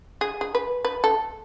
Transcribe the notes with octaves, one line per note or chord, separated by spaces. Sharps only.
G#4
G#4
B4
B4
A4